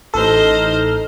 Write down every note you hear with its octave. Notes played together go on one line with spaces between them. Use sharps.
A1 D#4 A4 C5 D#5 F6